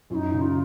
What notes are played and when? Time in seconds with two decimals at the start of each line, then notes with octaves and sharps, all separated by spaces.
0.10 F#2 F4
0.15 D#4
0.34 C#3
0.41 F4